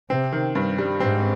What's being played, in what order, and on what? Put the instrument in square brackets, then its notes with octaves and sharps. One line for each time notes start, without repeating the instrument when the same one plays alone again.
[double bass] C3 [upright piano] C4
[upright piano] D#3
G2
G3
[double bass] G#2 [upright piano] C4